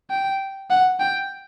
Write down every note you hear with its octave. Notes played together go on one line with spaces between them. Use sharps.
G5
F#5
G5